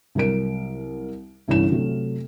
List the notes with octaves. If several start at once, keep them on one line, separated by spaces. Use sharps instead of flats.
C2 F#3 A#4 D7
G1 C2 E3 C#4 E4 E7
C3 F#3 A3